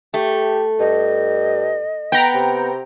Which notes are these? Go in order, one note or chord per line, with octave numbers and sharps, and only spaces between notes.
A3 G4
G2 D#5
B3 G5 A#5
C3